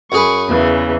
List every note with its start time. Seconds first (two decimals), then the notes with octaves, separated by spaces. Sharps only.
0.12 F#2 G#4 B4 C#6
0.49 E2 C#3 E3